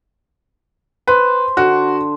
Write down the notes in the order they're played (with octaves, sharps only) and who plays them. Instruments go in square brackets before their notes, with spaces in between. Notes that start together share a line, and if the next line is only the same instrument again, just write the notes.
[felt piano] B4 [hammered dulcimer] C5
[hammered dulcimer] D3 [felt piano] F#4